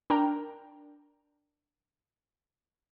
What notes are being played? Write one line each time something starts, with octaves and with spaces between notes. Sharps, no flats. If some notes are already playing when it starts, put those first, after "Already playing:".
D4 A#4 G5 A#5